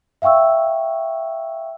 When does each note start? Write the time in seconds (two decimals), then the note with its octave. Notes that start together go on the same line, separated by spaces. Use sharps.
0.22 E5 F5 G5 C#6 E6